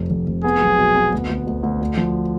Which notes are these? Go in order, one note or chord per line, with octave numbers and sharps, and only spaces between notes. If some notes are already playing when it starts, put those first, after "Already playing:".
Already playing: F1 F2
F1
F1
B3 G#4
B1
B2
B3
D2
D2
D2
D2
D2
F3